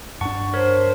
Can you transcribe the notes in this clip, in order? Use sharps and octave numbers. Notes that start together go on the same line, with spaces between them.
G2 D4 F#5 A5 C#6
A#4 C5 C#5